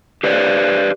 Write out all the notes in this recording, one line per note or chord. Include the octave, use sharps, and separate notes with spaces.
G4 B4 C5 D5